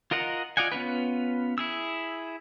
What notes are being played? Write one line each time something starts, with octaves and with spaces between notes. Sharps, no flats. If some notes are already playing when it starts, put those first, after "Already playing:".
F4 A#4 D#5 F#5 A#5
F4 D5 D#5 F#5 G#5
B3 C#4 F4 B4
E4 G#4 E6